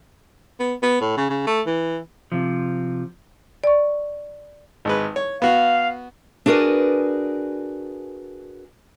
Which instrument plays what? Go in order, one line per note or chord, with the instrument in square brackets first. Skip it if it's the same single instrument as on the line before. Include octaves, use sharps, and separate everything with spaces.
[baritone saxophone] B3
B3
A2
C#3
C#3
A3
E3
[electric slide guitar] C3 F3
[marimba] D5 C#6
[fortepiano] G#1 G#3 B4
C#5
[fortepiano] B3 F#4 [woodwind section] F5
[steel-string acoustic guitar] D4 F#4 G#4 A#4 B4 D5